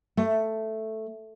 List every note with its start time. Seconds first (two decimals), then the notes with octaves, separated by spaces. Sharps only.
0.17 A3